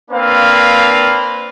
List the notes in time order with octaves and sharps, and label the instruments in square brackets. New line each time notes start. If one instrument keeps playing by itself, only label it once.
[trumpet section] A#3 C4 D4 B4 F5